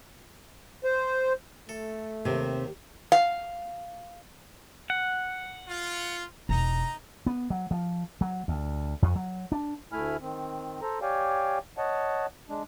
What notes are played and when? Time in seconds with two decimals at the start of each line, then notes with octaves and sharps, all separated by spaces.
0.84 C5
1.69 A3 A4
2.25 D#2 C3 D#3
3.12 F5
4.90 F#5
5.68 F4
6.49 E1 D#4 A#5
7.26 B3
7.50 F#3
7.71 F3
8.21 F#3
8.48 D2
9.02 F2
9.16 F#3
9.52 D4
9.92 D2 A3 E4 G#5 B5 F6
10.21 D#3 C4
10.82 A4 C5 A#5
11.02 G4 C#5 D5 F5 G5 G#5
11.78 C#5 D#5 F#5 A5
12.49 G#3 D4